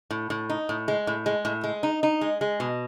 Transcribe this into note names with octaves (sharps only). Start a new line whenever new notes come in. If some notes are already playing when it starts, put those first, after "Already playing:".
A2
A2
D#4
A2
G#3
A2
G#3
A2
G#3
D#4
D#4
G#3
G#3
B2